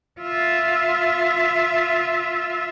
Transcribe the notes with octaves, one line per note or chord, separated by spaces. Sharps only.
F4 E5